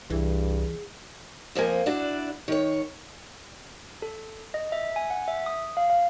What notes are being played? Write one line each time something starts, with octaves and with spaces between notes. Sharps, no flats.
C2 G2 E3 G#4
F2 F3 A#3 G#5
D4 E4 F#4 D5
D#3 C#5
A4
D#5
E5
G#5
F#5
E5
D#6
F5
F5